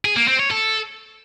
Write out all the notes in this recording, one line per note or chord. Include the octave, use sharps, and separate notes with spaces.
G#4
A#3
C4
C#5
A4